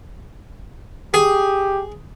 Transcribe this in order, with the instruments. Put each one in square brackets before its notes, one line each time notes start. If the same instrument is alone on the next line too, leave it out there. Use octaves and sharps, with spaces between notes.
[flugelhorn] G4 [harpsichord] G#4